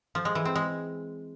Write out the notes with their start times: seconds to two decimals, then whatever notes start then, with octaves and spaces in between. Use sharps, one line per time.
0.15 F3
0.25 G#3
0.35 E3
0.45 C4
0.55 G#3